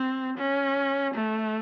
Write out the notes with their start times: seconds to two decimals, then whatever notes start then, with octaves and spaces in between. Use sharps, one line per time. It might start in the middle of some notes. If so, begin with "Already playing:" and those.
Already playing: C4
0.38 C#4
1.14 A3